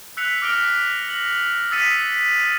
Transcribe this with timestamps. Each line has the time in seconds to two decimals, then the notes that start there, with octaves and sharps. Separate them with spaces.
0.17 E6 F#6 B6 C#7 F7
0.42 D6 F6 A#6 D7 F7 G7
1.09 A#6 F#7
1.71 D#6 E6 A6 B6 C#7 D#7